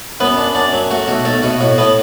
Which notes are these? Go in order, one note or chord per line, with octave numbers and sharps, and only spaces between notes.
F#2 B3 B4
D4
F#2 D4 D5
F#3
A3 F#4
B1 F#4
B1 A3 A4
B2 F#4
A2 F#4
A2 B3 B4